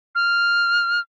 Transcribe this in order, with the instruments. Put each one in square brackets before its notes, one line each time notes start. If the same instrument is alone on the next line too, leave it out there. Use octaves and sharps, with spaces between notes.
[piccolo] F6